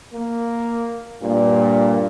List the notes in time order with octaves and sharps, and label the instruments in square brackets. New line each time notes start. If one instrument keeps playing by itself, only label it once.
[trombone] A#3
[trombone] G2 [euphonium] A#2